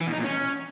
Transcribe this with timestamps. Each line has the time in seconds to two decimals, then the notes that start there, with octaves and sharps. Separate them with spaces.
0.01 E3
0.07 B2
0.12 D#4
0.18 A#2
0.24 C#4